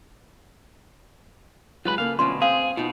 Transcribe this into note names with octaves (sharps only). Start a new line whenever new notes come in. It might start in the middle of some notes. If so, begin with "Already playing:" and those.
C2 F#3 G#3 F4 B4 B5
C#3 A#3 A4 F5
D2 B2 F#3 C#4 F4 C6
C4 G#4 F5
B2 D#4 F4